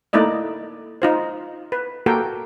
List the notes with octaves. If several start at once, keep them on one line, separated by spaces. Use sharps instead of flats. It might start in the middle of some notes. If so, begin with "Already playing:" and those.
A3 A#3 D#4 E4 D5 D#5
D#4 F4 C5
B4
A#3 F#4 G4 A4 A#4 G5